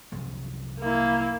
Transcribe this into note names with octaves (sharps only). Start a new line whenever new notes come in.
C2 F#2 F3
A#3 E4